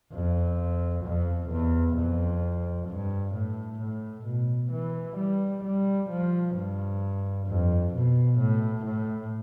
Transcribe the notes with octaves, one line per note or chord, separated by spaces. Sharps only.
F2
F2
E2
F2
G2
A2
A2
B2
E3
G3
G3
F3
G2
F2
B2
A2
A2